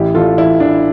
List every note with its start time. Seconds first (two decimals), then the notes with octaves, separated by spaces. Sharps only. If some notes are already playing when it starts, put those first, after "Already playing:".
Already playing: A1 E4 G4
0.14 A1 F4 A4
0.38 E3 E4
0.60 E3 D4